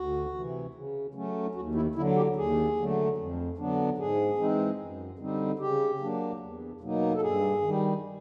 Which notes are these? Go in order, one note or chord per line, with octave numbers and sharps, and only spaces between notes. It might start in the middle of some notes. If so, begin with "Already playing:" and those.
Already playing: D2 F#4
C3 E3
C#3
F#3 A3 C#4
D#2 F#4
E4
D3 F#3 E4
G4
D#2 G#4
D3 F#3 A3
F2
D3 F#3 B3 D4
G#2 G#4
E3 G#3 C4 D#4
F#2
D3 G3 C4 D#4
C#3 G4
F#3 A#3 D4
E2
B2 F#3 A#3 D#4
A4
G2 G#4
D#3 G3